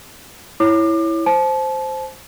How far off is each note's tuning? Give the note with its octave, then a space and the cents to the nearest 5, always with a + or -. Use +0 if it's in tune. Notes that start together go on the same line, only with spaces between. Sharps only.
E4 +0 C#5 +0 D6 +30
C5 +0 A5 -30